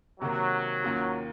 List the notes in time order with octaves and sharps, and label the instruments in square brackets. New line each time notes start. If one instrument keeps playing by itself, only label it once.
[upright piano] C3 D#3 A#3 [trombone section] F#3
[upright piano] D#2 D#3 A#3 C#4 F4